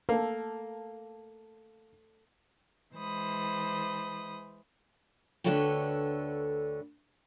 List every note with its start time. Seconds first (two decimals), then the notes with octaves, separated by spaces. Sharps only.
0.09 A#3 A4
2.95 E3 G#3 C5 B5 D#6
5.44 D2 D3 A4 B4 C#5 G5